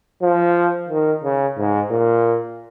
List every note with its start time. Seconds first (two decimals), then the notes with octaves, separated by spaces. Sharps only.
0.22 F3
0.89 D#3
1.24 C#3
1.57 G#2
1.90 A#2